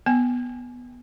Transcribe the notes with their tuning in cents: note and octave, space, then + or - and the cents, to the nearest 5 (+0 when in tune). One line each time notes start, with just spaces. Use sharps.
B3 -5 G#5 +20